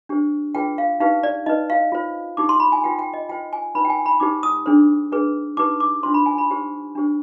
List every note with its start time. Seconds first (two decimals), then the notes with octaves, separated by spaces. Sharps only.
0.09 D4 G4 C5
0.55 D4 F4 G#4 B4 G5
0.78 F5
1.00 D#4 G4 B4 F5
1.23 D5
1.46 D#4 B4 D#5
1.70 F5
1.92 F4 C5
2.37 D#4 G4 C5 D6
2.49 C6
2.60 B5
2.72 G#5
2.84 F4 B4 G5
2.99 G5
3.14 D#5
3.29 F4 C5 G5
3.53 G#5
3.75 D#4 B4 B5
3.85 G5
3.90 G#5
4.06 B5
4.20 D#4 G4 C5 D6
4.43 D#6
4.66 D4 G#4 C5
5.12 D4 G#4 B4
5.57 D#4 G4 B4 D6
5.80 D6
6.03 D4 F4 C5 C6
6.14 B5
6.26 G#5
6.38 B5
6.49 D#4 G4 C5
6.95 D4 G4 C5